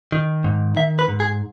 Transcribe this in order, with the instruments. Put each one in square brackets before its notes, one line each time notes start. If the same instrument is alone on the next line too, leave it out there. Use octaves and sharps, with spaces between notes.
[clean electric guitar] D#3
G#2
D#3 E5
B4
G#2
G#4